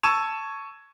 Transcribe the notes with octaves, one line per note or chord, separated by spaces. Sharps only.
A5 C#6 E6 G#6 D#7 E7